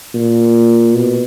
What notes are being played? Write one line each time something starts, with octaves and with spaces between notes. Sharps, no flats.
A#2
B2